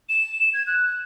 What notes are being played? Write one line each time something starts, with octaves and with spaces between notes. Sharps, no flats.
E7
G#6
F#6